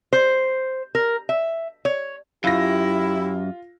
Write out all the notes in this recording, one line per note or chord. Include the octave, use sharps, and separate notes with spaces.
C5
A#4
E5
C#5
F#2 E4 F4 G4 A#6